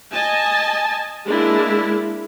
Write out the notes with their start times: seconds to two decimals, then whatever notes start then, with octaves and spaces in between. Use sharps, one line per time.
0.12 D#5 G#5 A5
1.25 G#3 A#3 D4 E4